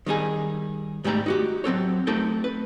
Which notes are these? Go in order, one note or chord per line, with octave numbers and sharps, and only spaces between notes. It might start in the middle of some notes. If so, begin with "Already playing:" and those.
D#3 G3 D#4 G#4
G#2 G3 A3 G5 A#5 B5
D#4 F#4 G4
F#3 C4 A4 C#5
A3 C4 D#4 G4 A4 A#4
B4